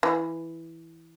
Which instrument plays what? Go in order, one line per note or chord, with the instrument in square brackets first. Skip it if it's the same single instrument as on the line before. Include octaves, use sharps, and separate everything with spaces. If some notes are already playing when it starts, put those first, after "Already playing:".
[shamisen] E3